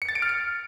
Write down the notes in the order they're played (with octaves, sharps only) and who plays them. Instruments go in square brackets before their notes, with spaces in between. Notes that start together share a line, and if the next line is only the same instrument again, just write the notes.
[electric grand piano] C#7
A6
D7
F6
D7